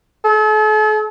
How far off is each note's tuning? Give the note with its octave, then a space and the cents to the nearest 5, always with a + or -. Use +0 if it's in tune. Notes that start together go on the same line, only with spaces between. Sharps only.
A4 -45